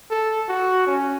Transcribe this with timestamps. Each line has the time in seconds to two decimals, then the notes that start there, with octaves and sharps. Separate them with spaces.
0.11 A4
0.49 F#4
0.87 C#4